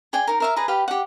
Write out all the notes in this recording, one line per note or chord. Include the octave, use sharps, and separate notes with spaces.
G#4 D5 G5 G#5
D#4 A#4
A#4 E5 F5
G#4 B4 D#5 A#5
G4 B4 F5 G5
G4 F#5